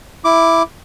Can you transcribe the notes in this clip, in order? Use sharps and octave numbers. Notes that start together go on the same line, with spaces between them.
E4 D6